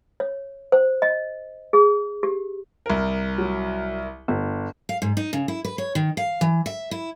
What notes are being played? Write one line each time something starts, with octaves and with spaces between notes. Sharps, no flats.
C#5
C5
D#5
G#4
G4
C2 A#4
F#3
G1
F5
G#2
D#4
C#3
E4
B4
C#5
D#3
F5
E3
E5
E4